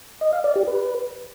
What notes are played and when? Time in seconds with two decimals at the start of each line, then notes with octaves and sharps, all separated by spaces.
0.21 D#5
0.33 F5
0.44 D5
0.56 G4
0.67 B4